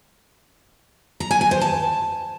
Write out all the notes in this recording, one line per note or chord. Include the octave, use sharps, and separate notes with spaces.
A#5
G#5
G#5
C5
A5